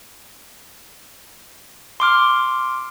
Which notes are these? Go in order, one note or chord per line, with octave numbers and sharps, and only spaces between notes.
C6 D6 F6